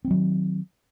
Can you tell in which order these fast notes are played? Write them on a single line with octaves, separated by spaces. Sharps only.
C4 G3 F#3 D#3